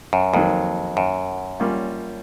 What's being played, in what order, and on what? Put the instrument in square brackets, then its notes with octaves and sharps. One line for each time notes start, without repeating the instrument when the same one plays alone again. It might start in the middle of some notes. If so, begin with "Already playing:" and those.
[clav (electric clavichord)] F#2
[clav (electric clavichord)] F2 [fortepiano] D#3 F#3 A#3
[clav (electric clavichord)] F#2
[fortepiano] G3 A#3 C#4 F4